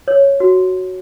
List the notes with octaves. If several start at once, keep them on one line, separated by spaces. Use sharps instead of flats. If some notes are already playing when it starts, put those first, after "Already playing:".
C#5
F#4